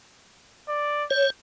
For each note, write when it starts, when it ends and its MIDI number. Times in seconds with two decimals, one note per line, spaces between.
0.69 1.05 74
1.11 1.30 73
1.11 1.28 91